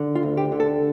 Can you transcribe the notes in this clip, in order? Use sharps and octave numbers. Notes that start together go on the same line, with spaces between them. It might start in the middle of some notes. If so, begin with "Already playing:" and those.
Already playing: D3
F4
D2
G4
D3
A4